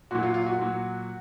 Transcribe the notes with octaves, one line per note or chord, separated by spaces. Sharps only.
A#2 F#3 F#4
F4
F4
F#4
A#2 F#3